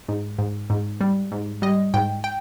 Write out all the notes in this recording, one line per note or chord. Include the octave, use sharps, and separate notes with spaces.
G#2
G#2
G#2
G3
G#2
G3 D#5
G#2 G5
G5